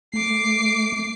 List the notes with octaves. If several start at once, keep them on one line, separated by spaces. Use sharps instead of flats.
A3 D6 C7